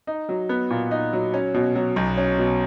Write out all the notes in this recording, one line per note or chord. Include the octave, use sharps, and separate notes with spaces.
D#4
F#3
B3
A#2
D#4
F#3
C#4
B2
F#3
B1
C#4
B2